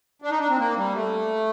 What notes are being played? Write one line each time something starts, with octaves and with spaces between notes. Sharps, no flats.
D4
D#4
D4
C4
A#3
G3
A3